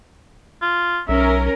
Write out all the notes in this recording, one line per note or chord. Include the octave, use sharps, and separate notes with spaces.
F4
B1 C#4 A#4 E5